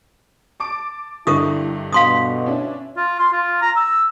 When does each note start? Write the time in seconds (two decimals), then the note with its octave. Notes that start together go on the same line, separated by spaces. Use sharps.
0.60 A5 D6 D7
1.27 G2 D3 D#4 E4 A#4 C#6 D#6
1.93 B2 F5 C6 D#6
2.46 C#4 D4 E4
2.97 F4
3.19 C6
3.32 F4
3.61 A#5
3.76 E6